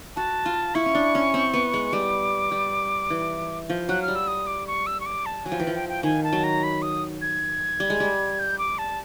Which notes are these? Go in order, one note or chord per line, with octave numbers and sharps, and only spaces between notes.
F#4 A5
F4
E4 C#6
C#4
D4
C#4
C4
B3
G#3
G3 D6
G3
E3
F3
F#3 F#6
F6
G3
E6
D#6
D6
C#6
E6
C#6
D6
A5
F#3 G#5
F3
E3 G5
F3
G5
G5
D#3 G#5
A5
F#3
A#5
B5
D#6
G#6
G3
G#3
G3
G6
D6
A5